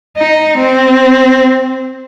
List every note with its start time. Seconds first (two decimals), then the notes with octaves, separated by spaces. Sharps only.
0.17 D#4
0.58 C4